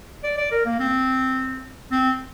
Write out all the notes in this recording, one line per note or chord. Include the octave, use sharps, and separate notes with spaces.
D5
D5
A#4
A#3
C4
C4